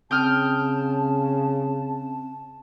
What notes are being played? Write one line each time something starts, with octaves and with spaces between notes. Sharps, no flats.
C#3 C4 G5 A5 D#6 F6